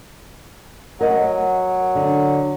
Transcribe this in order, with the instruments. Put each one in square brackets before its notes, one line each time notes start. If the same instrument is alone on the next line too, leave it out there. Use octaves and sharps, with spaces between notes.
[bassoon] F#3 [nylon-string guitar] A#4 D#5 F#5
[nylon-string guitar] D3